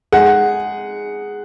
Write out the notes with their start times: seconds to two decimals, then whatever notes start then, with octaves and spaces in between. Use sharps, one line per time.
0.12 G#3 D#4 G#4 F#5